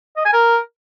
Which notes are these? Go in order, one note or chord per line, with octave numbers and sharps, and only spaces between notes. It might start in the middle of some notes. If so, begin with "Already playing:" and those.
D#5
G#5
A#4